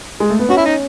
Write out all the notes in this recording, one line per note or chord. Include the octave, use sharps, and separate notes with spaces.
G#3
A3
B3
C#4 F#4
E4
D#4